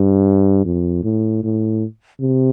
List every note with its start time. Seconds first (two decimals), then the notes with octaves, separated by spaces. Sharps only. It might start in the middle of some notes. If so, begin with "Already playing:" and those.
Already playing: G2
0.65 F2
1.03 A2
1.43 A2
2.21 C3